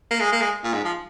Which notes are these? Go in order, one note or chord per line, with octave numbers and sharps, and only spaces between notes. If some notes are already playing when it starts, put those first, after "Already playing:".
A#3
G#3
A#3
G#3
A#2
G#2
F3